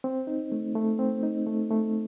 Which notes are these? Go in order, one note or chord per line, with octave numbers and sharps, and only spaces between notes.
C4
D#4
A3
A3
C4
D#4
A3
A3